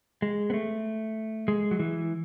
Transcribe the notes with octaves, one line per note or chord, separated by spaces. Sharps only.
G#3
B3
A3
G#3
F#3
E3